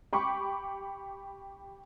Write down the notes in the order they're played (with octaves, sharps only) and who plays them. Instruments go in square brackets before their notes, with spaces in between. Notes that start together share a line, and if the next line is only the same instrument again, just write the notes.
[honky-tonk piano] G4 B5 C#6 D6